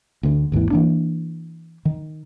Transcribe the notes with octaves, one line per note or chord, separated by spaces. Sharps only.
D2 D3
G#1 D#2 G#2 E3
E3 A#3 D4
D#3